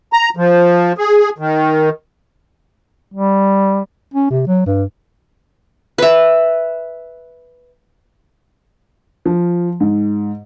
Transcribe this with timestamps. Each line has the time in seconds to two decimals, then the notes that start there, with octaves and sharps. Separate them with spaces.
0.13 A#5
0.37 F3
0.98 G#4
1.38 D#3
3.14 G3
4.14 C#4
4.30 C3
4.47 F#3
4.66 G2
5.98 B4 E5
9.26 F3
9.80 G#2